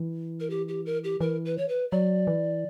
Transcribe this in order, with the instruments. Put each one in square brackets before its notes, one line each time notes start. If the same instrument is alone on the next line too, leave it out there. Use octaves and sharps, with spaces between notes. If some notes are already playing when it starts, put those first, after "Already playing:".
Already playing: [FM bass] E3
[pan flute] A#4
G4
G4
A#4
G4
[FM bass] E3 [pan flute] A#4
[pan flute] B4
C#5
B4
[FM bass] F#3 [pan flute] D5
[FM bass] E3